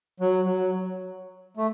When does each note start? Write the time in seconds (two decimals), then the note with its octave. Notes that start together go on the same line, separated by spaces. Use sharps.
0.20 F#3
0.45 F#3
1.57 A3